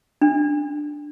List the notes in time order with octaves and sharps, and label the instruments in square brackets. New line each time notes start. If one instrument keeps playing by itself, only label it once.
[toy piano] D4